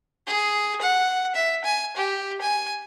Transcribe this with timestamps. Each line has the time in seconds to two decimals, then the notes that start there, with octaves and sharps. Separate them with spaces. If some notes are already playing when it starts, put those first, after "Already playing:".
0.27 G#4
0.81 F#5
1.35 E5
1.64 G#5
1.97 G4
2.41 G#5